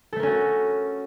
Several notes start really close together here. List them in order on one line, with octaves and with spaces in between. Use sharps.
A4 A3 A#4 C#4 F#4